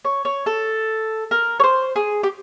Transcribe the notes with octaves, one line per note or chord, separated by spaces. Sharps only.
C#5
C#5
A4
A#4
C#5
C5
G#4
G4